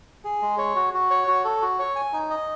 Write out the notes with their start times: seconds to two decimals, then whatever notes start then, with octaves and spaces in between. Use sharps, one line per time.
0.24 G#4
0.42 G#3
0.58 C#5
0.76 F#4
0.94 F#4
1.10 C#5
1.28 F#4
1.45 A4
1.62 F#4
1.79 C#5
1.96 G#5
2.13 D#4
2.30 D#5